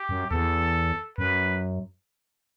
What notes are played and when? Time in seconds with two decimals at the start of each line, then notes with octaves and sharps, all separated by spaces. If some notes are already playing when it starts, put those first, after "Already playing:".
Already playing: G4
0.09 F#2
0.31 E2 A4
1.18 F#2 B4